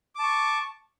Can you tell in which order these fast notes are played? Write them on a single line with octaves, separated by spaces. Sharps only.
D6 A5 C#6